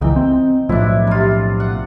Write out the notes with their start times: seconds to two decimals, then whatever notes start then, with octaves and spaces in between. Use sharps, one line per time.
0.01 C#2 E3 D#4 G5
0.16 C4
0.69 B1 A2 F3 D4 E4
1.07 C3 F4
1.60 F#5